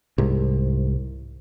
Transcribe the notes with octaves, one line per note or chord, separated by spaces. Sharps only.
C2 G#2